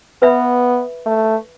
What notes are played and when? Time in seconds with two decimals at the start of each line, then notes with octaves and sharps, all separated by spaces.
0.22 B3 B4 E5 B5
1.06 A3